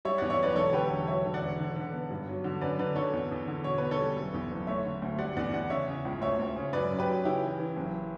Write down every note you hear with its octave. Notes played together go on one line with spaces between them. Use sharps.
G3 C#5 E5
E2 D5 F#5
C#5 E5
F#1 B4 D5
E1 A4 C#5
D3 G4 B4
E1
F#3 C#5 E5
D3
D5 F#5
E1
D3
D3
B3
G2
F#3
D3
F#2 B4 D5
D3 B4 D5
D3 A4 C#5
E2
E2
D3
B2 C#5
B3 B4
A4 C#5
G3
F#1
E2
F#1
A3 C#5 E5
D3
D2
G3 D5 F#5
E2 D5 F#5
E2 D5 F#5
C#3 C#5 E5
C#3
C#2
D2 C#5 E5
D2
C#3
F#2 B4 D5
F#2
G4 B4
F#3
C#3 E4 G4
E3
E3
F#1